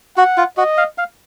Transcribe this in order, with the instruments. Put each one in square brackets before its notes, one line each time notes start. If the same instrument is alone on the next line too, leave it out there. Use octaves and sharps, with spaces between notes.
[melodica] F#4 [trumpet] F#5
[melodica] F4
[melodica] F#4 [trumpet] D#5
[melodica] F5
F5